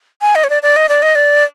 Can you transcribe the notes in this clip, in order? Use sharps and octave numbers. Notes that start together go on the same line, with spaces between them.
G#5
D#5
C#5
D5
D5
D#5
D5
D#5
D5